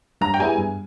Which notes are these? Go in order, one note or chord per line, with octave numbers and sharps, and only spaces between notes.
G2 A#5
G5
G3 B3 E4 G#4 G#5
G2